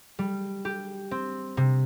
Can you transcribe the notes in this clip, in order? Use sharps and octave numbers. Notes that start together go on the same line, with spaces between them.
G3
G4
C4
C3